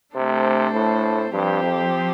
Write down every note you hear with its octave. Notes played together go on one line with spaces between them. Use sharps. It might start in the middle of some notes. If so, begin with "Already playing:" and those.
C3 A3 D4 A4 C5
A2
G2 F3 C4 G4 C5
F2